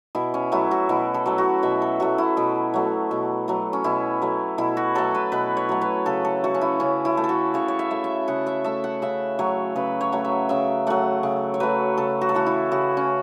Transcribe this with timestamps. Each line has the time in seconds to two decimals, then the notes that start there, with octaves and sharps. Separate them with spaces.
0.15 B2 E4
0.34 C#4
0.52 F#3 A3 E4
0.71 F#4
0.89 B2 E4
1.14 A4
1.26 F#3 A3
1.38 F#4
1.63 B2 E5
1.82 A4
2.00 F#3 A3 F#4
2.18 E4
2.37 B2
2.74 F#3 A3
3.11 B2
3.48 F#3 A3
3.73 C#4
3.84 B2 E4
4.22 F#3 A3
4.58 B2 E4
4.77 F#4
4.95 F#3 A3 A4
5.15 B4
5.32 B2 B4
5.57 C#5
5.69 F#3 A3
5.81 B4
6.06 C#3 A4
6.25 A4
6.44 A3 F#4
6.55 C#4
6.61 E4
6.80 C#3 C#4
7.05 E4
7.17 A3
7.24 A4
7.29 F#4
7.54 C#3 C#5
7.68 C#5
7.79 E5
7.91 A3
8.04 E5
8.28 C#3 F#5
8.47 E5
8.64 A3 E5
8.84 F#5
9.02 C#3 E5
9.39 F#3 A3 C#5
9.76 C#3 B4
10.01 C#5
10.12 F#3 A3
10.25 E5
10.49 C#3 E5
10.87 F#3 A3 F#5
11.23 C#3
11.54 C#5
11.60 F#3 A3 B4
11.97 C#3 A4
12.21 F#4
12.29 A4
12.35 E3 A3 F#4
12.46 E4
12.71 C#3 F#4
12.97 C#4